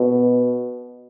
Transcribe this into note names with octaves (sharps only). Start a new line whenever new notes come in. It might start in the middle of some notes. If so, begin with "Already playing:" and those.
Already playing: B2